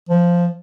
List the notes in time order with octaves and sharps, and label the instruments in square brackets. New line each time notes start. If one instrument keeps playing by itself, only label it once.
[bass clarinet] F3